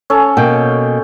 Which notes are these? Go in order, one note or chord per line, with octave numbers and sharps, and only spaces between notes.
C#4 A4 C#5
B2 A#3 G5